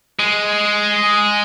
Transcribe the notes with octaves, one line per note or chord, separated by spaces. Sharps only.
G#3